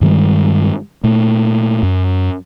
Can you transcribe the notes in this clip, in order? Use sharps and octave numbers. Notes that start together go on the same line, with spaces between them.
G2 D#3 G3 G#3
A#2 A3
F#2